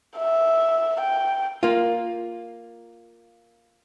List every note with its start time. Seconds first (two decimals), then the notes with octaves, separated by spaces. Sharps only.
0.18 E5
1.01 G5
1.63 A#3 F4